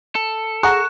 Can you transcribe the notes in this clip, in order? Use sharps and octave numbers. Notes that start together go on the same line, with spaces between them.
A4
G#4 F#5 A#5 C#6 F#6 E7